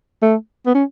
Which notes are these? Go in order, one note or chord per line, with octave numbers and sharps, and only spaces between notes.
A3
B3
C#4